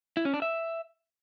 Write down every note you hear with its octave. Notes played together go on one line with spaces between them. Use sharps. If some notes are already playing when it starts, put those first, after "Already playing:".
E4
C#4
D4
E5